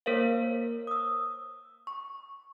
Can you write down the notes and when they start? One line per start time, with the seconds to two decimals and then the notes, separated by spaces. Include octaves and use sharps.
0.06 A#3 A#4 C5 C#5 F5
0.87 D#6 E6
1.87 C#6